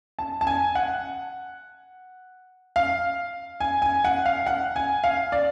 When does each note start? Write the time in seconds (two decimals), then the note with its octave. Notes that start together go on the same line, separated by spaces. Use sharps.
0.19 A5
0.41 A5
0.47 G#5
0.75 F#5
2.76 F5
3.60 G#5
3.82 G#5
4.05 F#5
4.26 F5
4.47 F#5
4.76 G#5
5.04 F5
5.32 D5